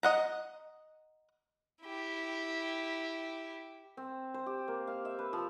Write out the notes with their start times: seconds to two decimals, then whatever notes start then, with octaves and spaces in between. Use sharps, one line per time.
0.03 D#5 F#5 A#5
1.83 E4 G4
3.97 C4
4.34 C5
4.46 G4
4.68 A#3
4.87 F5
5.05 E5
5.19 B4
5.33 F3